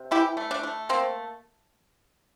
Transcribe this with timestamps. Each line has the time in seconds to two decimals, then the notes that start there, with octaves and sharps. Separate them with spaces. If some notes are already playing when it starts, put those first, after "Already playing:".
Already playing: C3
0.11 E3 E4 G4
0.37 A3
0.51 D4
0.63 A3
0.89 A#3 C4